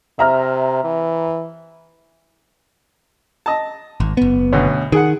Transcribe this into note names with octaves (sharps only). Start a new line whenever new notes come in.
C3 E5 A#5 F6
E3
D#5 A5
G#1
F#1 B3
D2 B2 C#4
D#3 G#4 F#5